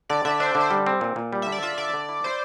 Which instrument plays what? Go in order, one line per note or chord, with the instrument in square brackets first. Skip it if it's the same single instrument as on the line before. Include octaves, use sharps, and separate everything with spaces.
[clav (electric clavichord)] D3 [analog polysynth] D5
[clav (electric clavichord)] D3 [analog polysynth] E5
[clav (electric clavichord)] D4 [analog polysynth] C5
[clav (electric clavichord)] D3
[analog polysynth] C5
[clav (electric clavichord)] G3
C4
A#2
A#2
G3
[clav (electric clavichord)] D3 [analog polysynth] E5
[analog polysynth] D5
[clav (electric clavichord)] F4 [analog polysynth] E5
[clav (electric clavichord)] D3 [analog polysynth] D5
[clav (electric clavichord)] D3
E4
[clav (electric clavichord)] E4 [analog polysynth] C5